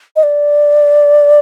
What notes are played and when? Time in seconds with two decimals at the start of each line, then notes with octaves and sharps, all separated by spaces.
0.16 D#5
0.23 D5